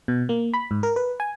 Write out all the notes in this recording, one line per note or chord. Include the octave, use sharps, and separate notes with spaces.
B2
A#3
B5
G#2
A#4
B4
G#5